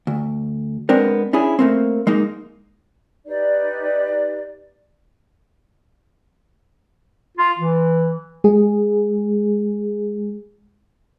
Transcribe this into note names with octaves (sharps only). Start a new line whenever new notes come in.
D2
G#3 B3 C4 D4 A#4
C#4 D4 E4 G#4
A3 A#3 C4
G#3 A#3 D#4
D#4 G4 B4 D5
F4
E3
G#3 G#4